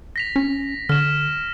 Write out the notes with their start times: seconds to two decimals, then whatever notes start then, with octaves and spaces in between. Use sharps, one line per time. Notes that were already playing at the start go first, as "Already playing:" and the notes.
0.16 A#6 B6 F7
0.36 C#4
0.89 D3 F6 E7